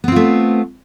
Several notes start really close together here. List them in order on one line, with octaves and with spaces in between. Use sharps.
B3 C4 F4 A3